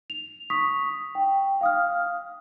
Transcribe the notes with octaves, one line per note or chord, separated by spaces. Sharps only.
F7
C#6 D#6 B6
G5
F5 D#6 F6